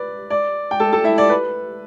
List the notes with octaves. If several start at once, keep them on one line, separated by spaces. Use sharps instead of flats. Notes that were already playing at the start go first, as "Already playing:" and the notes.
Already playing: B4 D5
D5
G5
A4 A5
A4 A5
E4 E5
D5
B4